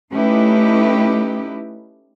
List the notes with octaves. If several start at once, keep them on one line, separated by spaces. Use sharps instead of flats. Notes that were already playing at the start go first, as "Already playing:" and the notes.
A3 C#4 D#4 E4 G4 B4